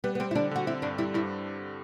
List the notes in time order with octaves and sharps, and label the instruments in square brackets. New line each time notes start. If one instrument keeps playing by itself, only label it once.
[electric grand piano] G3 [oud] B3
[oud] B3
[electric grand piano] G3 [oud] C4
[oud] E4
[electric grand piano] D3 [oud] D4
[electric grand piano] D3 [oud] F#4
[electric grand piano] C4 [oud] E4
[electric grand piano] G2 [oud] D4
[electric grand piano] G3 [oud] E4
[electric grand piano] G2 [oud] E4